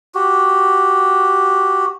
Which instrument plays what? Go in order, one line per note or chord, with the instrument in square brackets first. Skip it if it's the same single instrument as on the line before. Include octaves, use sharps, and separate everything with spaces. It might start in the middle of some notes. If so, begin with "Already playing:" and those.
[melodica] F#4 G4